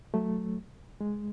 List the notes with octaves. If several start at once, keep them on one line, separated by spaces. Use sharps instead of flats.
F#3 A3
G#3